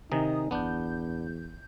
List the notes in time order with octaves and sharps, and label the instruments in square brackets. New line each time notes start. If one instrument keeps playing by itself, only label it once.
[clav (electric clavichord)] C3 D#3 [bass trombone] D#4 [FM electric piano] G#5 A#5 D#6
[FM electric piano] G1 G6 [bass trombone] E2 [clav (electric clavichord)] B3 D4